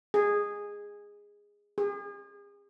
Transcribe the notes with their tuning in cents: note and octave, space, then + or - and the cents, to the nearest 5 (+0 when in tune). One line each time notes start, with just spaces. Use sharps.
G#4 -15
G#4 -40